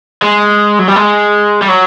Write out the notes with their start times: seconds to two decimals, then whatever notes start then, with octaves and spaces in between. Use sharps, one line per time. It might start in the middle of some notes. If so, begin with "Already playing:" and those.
0.22 G#3
0.79 F#3
0.88 G3
0.96 G#3
1.62 G3
1.68 F#3